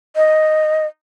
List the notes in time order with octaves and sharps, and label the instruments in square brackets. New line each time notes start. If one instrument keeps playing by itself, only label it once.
[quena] D#5